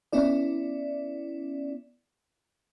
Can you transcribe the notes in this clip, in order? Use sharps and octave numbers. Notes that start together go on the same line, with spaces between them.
B3 C#4 E4 D5